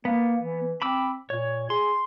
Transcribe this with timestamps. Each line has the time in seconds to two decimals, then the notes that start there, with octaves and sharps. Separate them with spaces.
0.05 A#3 B3
0.40 E3
0.82 C4 B5 D6 E6
1.30 A#2 C#5
1.70 G#4 C6